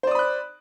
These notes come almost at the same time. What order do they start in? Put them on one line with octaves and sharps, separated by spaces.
C5 D5 D#6 B5 F#6